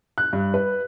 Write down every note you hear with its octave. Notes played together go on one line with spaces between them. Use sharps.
F#6
G2
B4